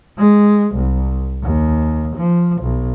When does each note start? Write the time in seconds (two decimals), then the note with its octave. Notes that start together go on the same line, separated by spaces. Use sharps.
0.18 G#3
0.76 C2
1.43 D#2
2.16 F3
2.62 B1